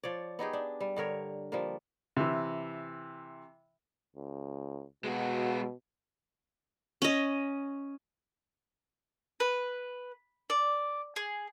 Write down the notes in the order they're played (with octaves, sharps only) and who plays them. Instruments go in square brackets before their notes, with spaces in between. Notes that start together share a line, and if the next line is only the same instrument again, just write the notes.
[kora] F3 C#5 D5
B3 D#4 G4 G#4
D4
G3
G2 D3 A#4 C#5
F3 G3 A#3
[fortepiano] C3 E3
[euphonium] C#2
[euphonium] B2 [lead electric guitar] G#3 F#4
[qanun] C#4 D#5
[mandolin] B4
D5
G#4